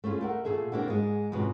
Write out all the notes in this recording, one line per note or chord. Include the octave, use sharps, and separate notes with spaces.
A3 C#4 E4 F4 G#4
A3 A#4 F#5
A#2 A3 G#4 A4 E5
A#3 C4 D4 E4 F#4
G#2 G#3
F2 G#2 B2 E3 C#4